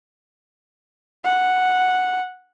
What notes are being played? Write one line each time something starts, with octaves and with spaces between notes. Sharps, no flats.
F#5